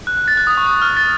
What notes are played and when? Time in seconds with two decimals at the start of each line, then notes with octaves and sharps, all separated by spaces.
0.07 F#6
0.17 F#6
0.28 A6
0.37 F#6
0.47 D#6
0.57 C#6
0.66 D#6
0.82 F6
0.97 A6